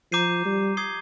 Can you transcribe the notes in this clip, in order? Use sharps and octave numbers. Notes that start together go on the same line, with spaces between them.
F3 A#5 D6 G6 C7 D#7
G3
D#6 G#6 C7 G7